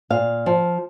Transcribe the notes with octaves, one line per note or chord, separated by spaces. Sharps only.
A#2 F5
F3